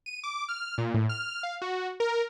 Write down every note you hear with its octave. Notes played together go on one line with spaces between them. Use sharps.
D#7
D6
F6
A#2
A2
F6
F5
F#4
A#4